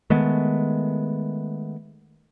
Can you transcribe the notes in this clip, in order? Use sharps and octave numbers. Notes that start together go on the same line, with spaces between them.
D#3 G#3 A3 B3